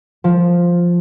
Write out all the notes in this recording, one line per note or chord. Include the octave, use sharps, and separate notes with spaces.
F3